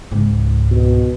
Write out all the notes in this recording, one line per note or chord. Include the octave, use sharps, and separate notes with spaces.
C#2 G#2
B2